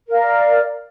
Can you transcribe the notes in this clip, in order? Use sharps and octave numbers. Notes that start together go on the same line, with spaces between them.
A#4 D5 F5